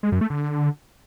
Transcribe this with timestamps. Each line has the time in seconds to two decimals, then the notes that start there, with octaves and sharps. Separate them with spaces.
0.03 G#3
0.12 F#2
0.21 A3
0.30 D3